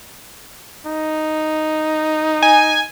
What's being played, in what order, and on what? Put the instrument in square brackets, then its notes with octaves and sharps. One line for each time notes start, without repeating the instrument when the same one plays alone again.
[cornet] D#4
[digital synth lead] G#5